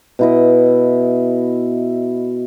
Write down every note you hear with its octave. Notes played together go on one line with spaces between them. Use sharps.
B2 E4 D#5